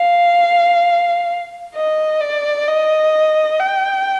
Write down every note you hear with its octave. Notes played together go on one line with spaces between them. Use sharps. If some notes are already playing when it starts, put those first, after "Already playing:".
Already playing: F5
D#5
D5
D#5
G5